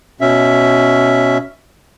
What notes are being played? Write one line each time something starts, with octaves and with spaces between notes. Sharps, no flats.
B2 C#4 E5